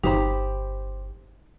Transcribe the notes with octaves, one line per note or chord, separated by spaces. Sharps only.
G1 D#4 G4 C5 B5